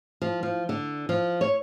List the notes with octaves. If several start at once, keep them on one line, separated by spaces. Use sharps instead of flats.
F3
F3
D3
F3
C#5